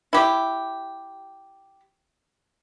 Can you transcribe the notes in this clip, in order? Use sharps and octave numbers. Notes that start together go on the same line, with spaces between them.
E4 G4